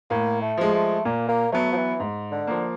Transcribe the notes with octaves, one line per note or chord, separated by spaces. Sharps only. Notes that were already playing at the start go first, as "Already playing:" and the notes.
A2 A#3
A3
F3 G#3
A3
A#2 A#3
A#3
F#3 A3 B3
F3
E3
G#2
D3
F3 A#3